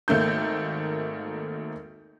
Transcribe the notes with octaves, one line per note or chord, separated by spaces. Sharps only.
G#1 A3 A#3 G6